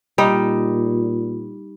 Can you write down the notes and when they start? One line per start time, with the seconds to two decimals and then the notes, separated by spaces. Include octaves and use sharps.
0.18 A#2 G3 D#4